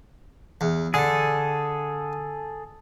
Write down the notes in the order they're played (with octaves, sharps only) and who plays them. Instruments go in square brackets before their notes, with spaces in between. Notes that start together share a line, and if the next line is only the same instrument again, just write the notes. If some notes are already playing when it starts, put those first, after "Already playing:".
[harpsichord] E2
[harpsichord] D3 [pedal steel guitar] G#4 A4